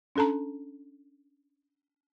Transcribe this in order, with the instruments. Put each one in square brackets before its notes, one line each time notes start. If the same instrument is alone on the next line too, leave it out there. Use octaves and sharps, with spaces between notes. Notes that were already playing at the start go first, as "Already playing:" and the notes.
[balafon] C#4 D4 A4 A5 A#5